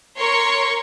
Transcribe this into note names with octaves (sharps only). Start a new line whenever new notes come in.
A#4 C#5 C6 C#6